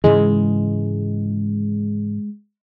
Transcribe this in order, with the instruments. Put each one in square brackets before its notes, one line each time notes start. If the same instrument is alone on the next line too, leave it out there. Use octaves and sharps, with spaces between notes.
[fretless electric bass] G#2 C#3 E3 [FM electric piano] G#3